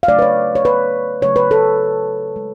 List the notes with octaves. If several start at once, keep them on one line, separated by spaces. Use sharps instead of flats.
F5
C#3 F#3 A3 D5
B4
C#5
C#5
B4
C#3 F#3 A3 C#5
B4
A4
G#3